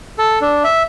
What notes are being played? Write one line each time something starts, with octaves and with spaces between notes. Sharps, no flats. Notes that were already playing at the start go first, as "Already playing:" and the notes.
A4
D4
E5